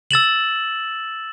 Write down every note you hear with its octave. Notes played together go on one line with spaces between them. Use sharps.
E6 A6 E7 F#7